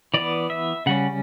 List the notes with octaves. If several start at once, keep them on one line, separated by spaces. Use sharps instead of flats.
E3 B3 D5
E5
C#3 G3 C#4 F#5